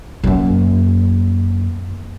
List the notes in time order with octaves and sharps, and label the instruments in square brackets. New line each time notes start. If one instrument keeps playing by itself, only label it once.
[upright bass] F#2 A#3